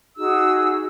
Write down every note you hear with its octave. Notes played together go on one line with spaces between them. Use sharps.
D#4 F#4 G#4 E6